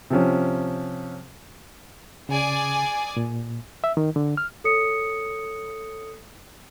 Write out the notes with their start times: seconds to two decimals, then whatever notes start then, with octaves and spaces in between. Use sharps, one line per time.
0.10 C3 F3 C#4
2.29 C#3 G#4 D5 G#5
3.17 A#2
3.84 E5
3.97 D#3
4.16 D3
4.37 F6
4.64 A4 C#5 D#6 C#7